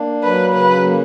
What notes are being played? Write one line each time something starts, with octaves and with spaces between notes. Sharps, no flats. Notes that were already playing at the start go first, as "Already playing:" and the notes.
Already playing: A#3 D4
F#3 B4
C#3 B4
A#3